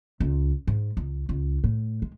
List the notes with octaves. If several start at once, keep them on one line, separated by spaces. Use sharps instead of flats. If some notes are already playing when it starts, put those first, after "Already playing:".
C#2
G#2
C#2
C#2
A2
G#3